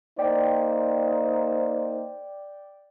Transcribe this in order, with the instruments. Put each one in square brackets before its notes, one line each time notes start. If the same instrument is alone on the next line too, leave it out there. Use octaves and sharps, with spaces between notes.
[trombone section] A#3 D#4 C5 [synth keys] D5 G5